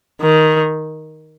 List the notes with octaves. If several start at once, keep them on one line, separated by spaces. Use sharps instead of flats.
D#3